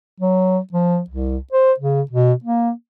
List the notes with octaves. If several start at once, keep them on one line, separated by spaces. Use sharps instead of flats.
F#3
F3
C2
C5
C#3
B2
A#3